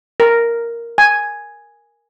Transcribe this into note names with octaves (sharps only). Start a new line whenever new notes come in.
A#4
G#5